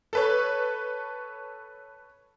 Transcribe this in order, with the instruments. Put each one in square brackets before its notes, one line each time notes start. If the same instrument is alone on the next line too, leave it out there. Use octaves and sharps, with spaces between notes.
[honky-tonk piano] A4 B4 C#5